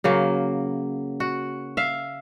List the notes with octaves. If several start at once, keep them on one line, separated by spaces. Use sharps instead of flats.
C#3 F#3 A#3
F#4
E5 F5